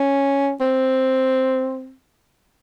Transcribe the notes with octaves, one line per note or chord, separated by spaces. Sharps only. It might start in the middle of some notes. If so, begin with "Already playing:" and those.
Already playing: C#4
C4